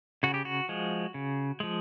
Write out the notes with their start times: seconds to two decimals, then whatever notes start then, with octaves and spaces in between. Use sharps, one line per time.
0.23 C#3 F#4
0.34 G4
0.45 F#4
0.69 F3 G#3
1.14 C#3
1.60 F3 G#3